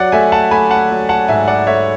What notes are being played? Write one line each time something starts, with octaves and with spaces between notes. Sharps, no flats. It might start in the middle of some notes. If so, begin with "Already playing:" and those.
Already playing: F#3 D5 F#5
A3 E5 G#5
F#5 A5
A3 G#5 B5
F#5 A5
F#3
F#5 A5
G#2 E5 G#5
D5 F#5
A3 C#5 E5